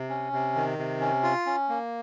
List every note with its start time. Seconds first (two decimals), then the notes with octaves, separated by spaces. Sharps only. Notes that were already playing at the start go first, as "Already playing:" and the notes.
Already playing: C3
0.09 C#4
0.33 C3
0.55 D#3
0.78 C3
1.01 C#4
1.23 F4
1.46 C#4
1.69 A#3